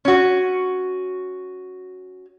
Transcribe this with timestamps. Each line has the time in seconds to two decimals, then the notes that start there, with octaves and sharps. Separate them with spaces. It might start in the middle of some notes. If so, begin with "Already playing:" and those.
0.05 C#4 F#4